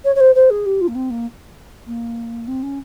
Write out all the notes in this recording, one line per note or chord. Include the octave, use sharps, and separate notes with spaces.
C#5
C#5
C5
C5
G#4
G4
F4
A#3
C4
A#3
A#3
C4
C#4